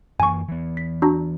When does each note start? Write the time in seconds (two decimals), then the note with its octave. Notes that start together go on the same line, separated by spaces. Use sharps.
0.20 F#2 E3 A#3 G#5 C#6
0.48 E3 B3
0.77 B6
1.02 D4 F#4 A#5